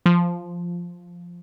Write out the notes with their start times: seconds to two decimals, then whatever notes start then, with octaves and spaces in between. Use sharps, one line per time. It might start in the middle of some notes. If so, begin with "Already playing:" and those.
0.06 F3